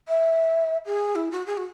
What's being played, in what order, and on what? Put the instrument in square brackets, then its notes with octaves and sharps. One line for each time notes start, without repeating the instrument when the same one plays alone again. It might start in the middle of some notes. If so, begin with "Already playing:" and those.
[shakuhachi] E5
G#4
E4
F#4
G#4
F#4